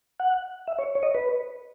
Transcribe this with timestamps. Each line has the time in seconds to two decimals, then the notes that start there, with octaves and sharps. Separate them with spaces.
0.19 F#5
0.67 E5
0.79 C#5
0.95 C#5
1.03 D#5
1.14 B4